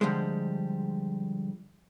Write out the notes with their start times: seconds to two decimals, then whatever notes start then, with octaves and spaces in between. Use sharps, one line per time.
0.01 D3 F3 G3 G#3